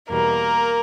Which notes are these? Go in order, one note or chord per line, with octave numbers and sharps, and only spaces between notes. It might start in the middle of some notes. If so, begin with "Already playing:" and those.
E2 B2 G3 A#3 A#4